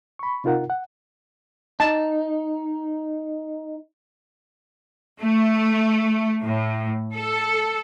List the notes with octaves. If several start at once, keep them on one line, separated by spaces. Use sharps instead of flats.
B5 C#6
C3 D#4 F4 A#4 F#5
F#5
D#4 A5
A3
A2
A4